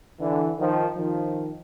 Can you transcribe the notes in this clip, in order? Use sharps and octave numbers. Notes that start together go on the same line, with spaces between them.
D3 E3
D#3 F3
D#3 F3